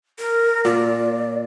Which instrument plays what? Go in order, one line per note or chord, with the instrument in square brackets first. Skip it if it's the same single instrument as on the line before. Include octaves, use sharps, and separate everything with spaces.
[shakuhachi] A#4
[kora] A#2 [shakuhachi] D5